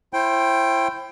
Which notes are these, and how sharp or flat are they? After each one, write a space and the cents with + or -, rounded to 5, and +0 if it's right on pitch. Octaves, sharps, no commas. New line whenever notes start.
E4 +25 C5 +30 G5 +0